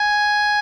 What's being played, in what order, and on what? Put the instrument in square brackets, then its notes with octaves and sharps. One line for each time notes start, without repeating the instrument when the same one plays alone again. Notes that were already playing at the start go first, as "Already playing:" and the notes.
Already playing: [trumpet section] G#5